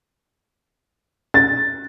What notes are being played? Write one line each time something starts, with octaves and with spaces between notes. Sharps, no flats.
A6